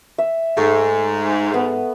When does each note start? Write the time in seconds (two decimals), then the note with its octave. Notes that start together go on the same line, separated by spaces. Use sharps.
0.18 E5
0.57 G#2 A3
1.54 B3